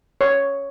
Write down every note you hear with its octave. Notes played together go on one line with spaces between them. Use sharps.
C#5